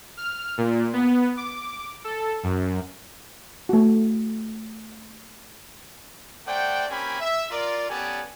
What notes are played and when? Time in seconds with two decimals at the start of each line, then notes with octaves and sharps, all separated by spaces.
0.17 F6
0.58 A#2
0.93 B3
1.37 D6
2.04 A4
2.43 F#2
3.69 A3 F#4
6.47 A3 C5 D5 F#5 G5
6.89 A#3 C4 C#4 G4 G#5 B5
7.21 E5
7.51 F4 A#4 D5
7.89 B3 C#4 G4 A4 D5 G#5